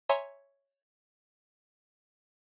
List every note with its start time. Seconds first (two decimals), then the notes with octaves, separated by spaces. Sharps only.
0.09 C#5 E5 G#5 A#5 C6